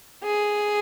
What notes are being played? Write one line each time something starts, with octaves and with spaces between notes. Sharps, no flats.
G#4